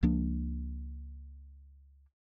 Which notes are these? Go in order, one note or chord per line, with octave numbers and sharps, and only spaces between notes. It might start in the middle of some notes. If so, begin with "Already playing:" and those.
C#2 F3 A#3 D4